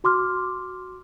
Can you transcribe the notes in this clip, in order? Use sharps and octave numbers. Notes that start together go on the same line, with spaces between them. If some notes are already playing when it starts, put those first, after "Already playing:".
F#4 C6 D6 F6